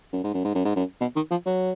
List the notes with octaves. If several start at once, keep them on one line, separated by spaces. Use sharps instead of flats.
F#2
G#2
F#2
G#2
F#2
G#2
F#2
B2
D#3
F3
F#3